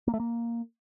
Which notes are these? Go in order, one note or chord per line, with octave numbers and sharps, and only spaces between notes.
A#3
A3
A#3